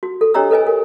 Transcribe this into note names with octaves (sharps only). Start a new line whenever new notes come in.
F#4
A4
D4 G4 C#5 D#5 A#5 E6
A4 B4 D#5 G#5
A#4